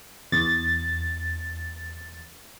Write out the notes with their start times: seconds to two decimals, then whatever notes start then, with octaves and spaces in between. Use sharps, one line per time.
0.32 E2 A6